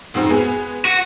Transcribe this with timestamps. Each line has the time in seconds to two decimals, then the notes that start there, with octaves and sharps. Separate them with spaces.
0.14 F1 G#2 C4
0.29 G#3 B3 G#4
0.85 F#4